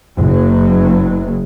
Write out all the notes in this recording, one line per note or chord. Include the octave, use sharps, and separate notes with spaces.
F#1 F#3